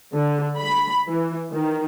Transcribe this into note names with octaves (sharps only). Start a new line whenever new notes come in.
D3
B5
E3
D#3